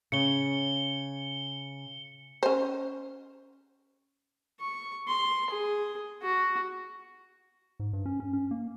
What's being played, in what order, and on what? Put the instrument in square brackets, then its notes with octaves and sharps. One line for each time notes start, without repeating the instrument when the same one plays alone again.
[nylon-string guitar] C#3 [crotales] C#7 G7
[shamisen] C#4 C5
[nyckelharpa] C#6
C6
G#4
F#4
[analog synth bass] G#2
G2
C#4
C#4
C#4
A#3